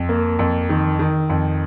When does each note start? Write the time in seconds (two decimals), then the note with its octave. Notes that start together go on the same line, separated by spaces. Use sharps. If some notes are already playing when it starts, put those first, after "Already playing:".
Already playing: F2
0.09 A#3
0.39 F2
0.69 D#3
0.99 D#3
1.30 F2